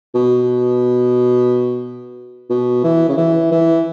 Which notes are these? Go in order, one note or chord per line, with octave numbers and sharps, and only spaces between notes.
B2
B2
E3
C#3
E3
E3